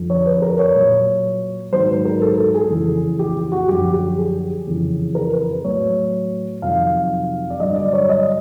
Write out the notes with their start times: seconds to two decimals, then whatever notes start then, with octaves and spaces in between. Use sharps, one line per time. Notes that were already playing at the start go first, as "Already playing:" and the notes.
Already playing: F2 D3 F3
0.10 C#5
0.26 B4
0.42 A#4
0.59 C#5
0.75 A#2 F#3
1.72 G#2 D#3 F#3 C5
1.89 B4
2.05 A#4
2.22 A4
2.38 A4
2.54 G#4
2.70 F2 C#3 E3
3.19 G4
3.36 G4
3.52 F#4
3.68 F#2 D3 F3 G4
3.93 G4
4.18 G#4
4.67 F2 C#3 E3
5.15 A#4
5.32 B4
5.64 A2 F#3 C#5
6.62 F2 C3 D#3 F#3 F5
7.50 D5
7.60 G2 D3 F#3 D#5
7.76 D5
7.93 C#5
8.09 D#5